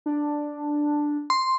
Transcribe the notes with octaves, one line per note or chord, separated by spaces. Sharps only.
D4
C6